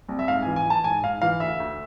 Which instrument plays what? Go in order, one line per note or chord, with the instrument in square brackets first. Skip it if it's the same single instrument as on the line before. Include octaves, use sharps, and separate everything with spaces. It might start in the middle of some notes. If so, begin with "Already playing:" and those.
[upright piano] C2
E5
G#2 F5
E3 G#5
G#5
E3 A5
G#2 G#5
G#2 F5
E3 F5
D2 E5
D2